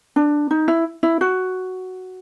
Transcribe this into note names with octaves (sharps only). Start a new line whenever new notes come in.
D4
D#4
E4
E4
F#4